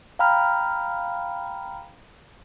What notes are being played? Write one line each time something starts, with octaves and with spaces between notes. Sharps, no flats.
F5 G5 A#5 B5 F6